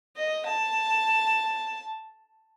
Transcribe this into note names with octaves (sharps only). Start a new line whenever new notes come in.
D#5
A5